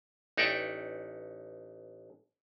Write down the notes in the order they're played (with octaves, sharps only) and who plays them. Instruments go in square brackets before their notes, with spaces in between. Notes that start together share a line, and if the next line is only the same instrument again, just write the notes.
[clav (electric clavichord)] A1 D#4 C#5 D5 E5 G5